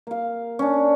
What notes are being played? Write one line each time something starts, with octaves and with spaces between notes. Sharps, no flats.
A#3 F5
C#4 D4